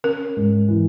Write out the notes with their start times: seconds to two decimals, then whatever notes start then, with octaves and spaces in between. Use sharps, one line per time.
0.04 C#4 A#4
0.36 G#2
0.68 E3